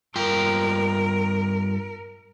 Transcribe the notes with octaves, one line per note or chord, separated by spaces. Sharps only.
G2 F4 A#4 G5